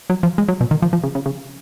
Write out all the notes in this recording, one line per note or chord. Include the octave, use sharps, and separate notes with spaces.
F#3
F3
G#3
F#3
B2
D#3
F3
F3
C#3
C#3
C#3